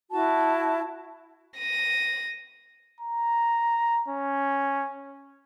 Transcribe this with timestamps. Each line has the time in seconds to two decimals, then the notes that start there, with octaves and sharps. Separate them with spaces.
0.11 E4 F#4 A5
1.58 A#6 D#7
3.01 A#5
4.08 C#4